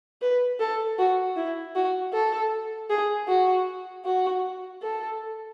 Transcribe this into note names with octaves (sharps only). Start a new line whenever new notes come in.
B4
A4
F#4
E4
F#4
A4
G#4
F#4
F#4
A4